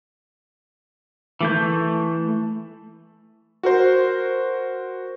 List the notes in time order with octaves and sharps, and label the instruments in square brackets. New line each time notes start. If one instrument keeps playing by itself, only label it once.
[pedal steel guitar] E3 A3 G6
[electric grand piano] F#4 A#4 C5